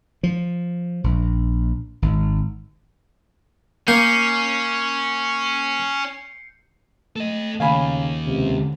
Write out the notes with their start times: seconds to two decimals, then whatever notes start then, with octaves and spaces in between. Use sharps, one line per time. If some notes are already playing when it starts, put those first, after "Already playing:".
0.23 F3
1.04 A#1
2.02 G#1
3.88 A#3 C#4 G6 C7 C#7
7.16 A3 A4 D#5
7.60 D#2 C#3 F5 G#5 B5
8.26 C#2 C3